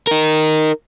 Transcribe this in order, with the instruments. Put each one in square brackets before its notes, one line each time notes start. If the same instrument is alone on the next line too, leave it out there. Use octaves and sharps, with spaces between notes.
[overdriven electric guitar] D#4 A#4